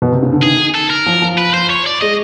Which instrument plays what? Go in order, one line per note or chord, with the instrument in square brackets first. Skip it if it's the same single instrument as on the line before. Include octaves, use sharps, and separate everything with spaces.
[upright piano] B2
C3
C#3
D3
[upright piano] D#3 [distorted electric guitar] G#4
[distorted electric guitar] A4
A#4
[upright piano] F3
F3
[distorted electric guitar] B4
C5
C#5
D5
[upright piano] G#3 [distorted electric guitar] D#5